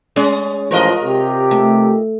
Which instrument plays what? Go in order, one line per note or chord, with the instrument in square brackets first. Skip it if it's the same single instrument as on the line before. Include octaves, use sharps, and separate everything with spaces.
[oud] G#3 [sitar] C#4
[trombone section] A1 F3 [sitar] F4 A#4 D#5
[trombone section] C3 G4
[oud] A3